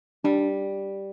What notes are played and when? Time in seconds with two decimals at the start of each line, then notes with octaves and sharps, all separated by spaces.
0.24 G3 D4